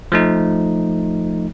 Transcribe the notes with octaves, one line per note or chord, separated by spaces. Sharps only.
F3 A3 D#4